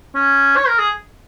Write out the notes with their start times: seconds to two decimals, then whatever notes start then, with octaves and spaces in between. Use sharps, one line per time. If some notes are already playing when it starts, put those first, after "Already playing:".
0.15 C#4
0.57 C#5
0.68 A#4
0.79 G#4